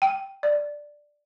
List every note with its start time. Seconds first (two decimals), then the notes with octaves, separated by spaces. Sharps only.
0.02 G5
0.43 D5